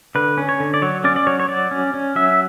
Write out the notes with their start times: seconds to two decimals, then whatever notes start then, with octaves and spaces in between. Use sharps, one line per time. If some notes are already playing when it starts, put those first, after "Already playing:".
0.15 D3 B4
0.37 C#4
0.49 C#5
0.60 D3
0.74 D5
0.82 F#3 C#5
1.04 C#4 D5
1.16 D5
1.27 F#3 C#5
1.40 C#5
1.49 F#3 D5
1.71 C#4
1.94 C#4
2.16 F#3 E5